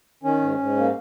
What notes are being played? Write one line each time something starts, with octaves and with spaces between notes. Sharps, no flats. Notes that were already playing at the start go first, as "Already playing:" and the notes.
D#3 C#4
G#2
G#2
A#3